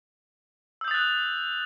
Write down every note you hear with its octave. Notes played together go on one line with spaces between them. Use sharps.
D#6 E6 F#6 G6 A6